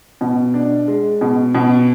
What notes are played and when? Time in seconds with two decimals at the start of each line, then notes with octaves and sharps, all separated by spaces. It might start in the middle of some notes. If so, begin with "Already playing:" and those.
0.21 B2
0.54 D4
0.88 G#3
1.21 B2
1.55 B2